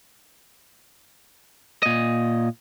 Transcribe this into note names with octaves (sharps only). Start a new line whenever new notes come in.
A#2 D#5